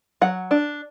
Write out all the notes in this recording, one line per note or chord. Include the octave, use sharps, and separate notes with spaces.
F#3 F#5
D4